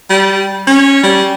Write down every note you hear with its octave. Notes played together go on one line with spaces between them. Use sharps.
G3
C#4
G3